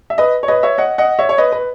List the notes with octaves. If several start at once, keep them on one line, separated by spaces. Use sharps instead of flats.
E5
B4 D#5
C#5
B4 D#5
C#5 E5
D#5 F#5
D#5 F#5
C#5 E5
C#5
B4 D#5
B4